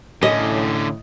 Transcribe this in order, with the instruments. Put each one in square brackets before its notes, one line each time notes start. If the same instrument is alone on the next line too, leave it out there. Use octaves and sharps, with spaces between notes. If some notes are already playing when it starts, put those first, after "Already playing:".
[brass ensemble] A2 [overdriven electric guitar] D3 C#4 [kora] D#5